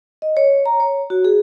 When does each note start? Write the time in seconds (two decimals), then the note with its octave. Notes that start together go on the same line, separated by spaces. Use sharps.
0.22 D#5
0.37 C#5
0.66 A#5
0.80 C#5
1.10 F#4
1.25 G#4